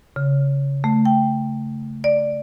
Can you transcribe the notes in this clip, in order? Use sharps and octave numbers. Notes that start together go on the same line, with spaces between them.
C#3
A3
G5
D5